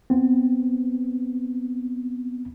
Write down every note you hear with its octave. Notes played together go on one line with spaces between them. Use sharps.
B3 C4